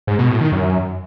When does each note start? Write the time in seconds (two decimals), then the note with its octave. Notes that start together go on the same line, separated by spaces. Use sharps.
0.07 G#2
0.19 B2
0.30 A2
0.41 D#3
0.52 F#2